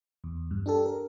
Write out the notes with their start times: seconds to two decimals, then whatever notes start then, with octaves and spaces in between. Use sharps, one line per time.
0.24 E2
0.51 G2
0.66 D4 G4 A4
0.86 A#4